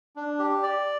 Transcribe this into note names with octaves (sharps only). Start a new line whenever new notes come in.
D4
G4
D5